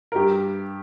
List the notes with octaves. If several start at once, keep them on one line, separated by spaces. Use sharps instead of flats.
A#4
G2 G4